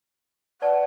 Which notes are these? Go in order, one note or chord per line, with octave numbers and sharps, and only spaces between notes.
B4 D5 F#5 A5